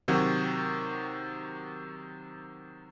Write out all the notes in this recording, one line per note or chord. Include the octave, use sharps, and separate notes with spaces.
C3 D#3 F#3 F#4 G#6